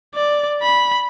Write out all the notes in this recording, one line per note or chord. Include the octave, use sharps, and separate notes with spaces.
D5
B5